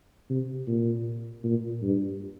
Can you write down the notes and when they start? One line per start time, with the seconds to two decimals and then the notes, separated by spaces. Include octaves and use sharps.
0.30 C3
0.68 A#2
1.44 A#2
1.83 G2